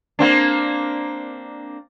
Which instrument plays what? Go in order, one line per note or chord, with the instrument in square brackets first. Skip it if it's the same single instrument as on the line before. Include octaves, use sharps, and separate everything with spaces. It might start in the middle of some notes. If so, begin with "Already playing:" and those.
[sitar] A#3 C4 D4